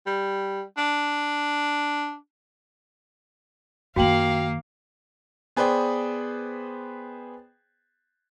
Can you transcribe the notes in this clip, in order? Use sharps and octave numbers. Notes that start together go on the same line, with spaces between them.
G3
D4
F#2 D#3 A#3 F#4 F5 G5 F#7
B3 G#4 B4 C5 D5 G5